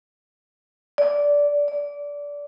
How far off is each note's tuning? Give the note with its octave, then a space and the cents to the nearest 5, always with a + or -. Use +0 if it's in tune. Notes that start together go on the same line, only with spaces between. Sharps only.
D5 -15
D5 -20